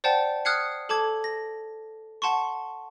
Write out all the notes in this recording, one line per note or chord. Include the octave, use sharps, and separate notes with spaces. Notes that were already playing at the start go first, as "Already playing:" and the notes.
C5 D5 F#5 G5 A5
D#6 F6 F#6 G#6 C7 C#7
A4 A5 D6 G#6
A#6
F#5 A5 C6 C#6